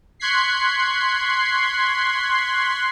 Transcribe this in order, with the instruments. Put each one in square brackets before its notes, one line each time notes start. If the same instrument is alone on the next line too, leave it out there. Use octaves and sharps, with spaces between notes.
[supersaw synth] C6 C#6 F#6 G#6 B6 C7